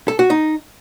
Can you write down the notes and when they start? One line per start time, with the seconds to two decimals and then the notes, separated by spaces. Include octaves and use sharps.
0.08 A4
0.19 F#4
0.30 D#4